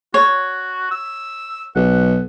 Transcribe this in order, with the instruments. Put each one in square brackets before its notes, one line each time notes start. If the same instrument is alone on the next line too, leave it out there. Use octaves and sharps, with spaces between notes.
[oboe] F#4 [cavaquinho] C#5
[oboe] E6
[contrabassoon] B1 [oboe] F#5